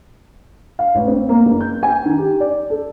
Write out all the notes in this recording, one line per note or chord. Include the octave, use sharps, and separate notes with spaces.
F5
A1
C4
A#3
F#1
G6
G#5
D#3
G4
D5
A4